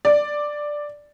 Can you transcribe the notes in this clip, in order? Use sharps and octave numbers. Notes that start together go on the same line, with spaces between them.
D5